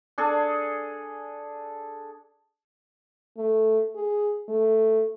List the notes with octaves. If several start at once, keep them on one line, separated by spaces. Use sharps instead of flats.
D4 G#4 A4
A3
G#4
A3